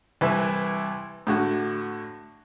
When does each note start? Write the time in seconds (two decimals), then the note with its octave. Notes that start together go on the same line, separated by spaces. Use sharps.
0.21 C2 E3 B4 E5
1.27 A2 D3 F#4